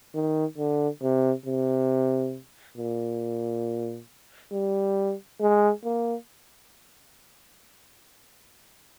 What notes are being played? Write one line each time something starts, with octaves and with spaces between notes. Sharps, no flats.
D#3
D3
C3
C3
A#2
G3
G#3
A#3